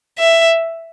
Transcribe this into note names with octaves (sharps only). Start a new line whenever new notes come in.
E5